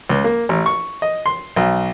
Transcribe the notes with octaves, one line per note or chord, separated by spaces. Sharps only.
C#2
A#3
A1
C#6
D#5
C6
B1